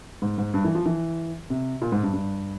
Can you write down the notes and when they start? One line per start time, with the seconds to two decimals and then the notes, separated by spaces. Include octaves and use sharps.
0.22 G#2
0.38 G#2
0.54 G2
0.64 E3
0.75 F3
0.86 E3
1.50 C3
1.82 A#2
1.92 G#2
2.03 G2
2.13 G2